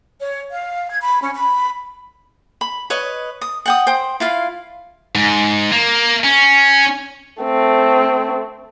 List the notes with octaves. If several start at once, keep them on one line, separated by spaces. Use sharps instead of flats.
C#5
F5
G#6
B5
C#4
B5
B5
B4 C#5 D#5
D#6
F#5 G5 D#6
C5 G5
E4 F4 F5
G#2
A#3
C#4
A3 C4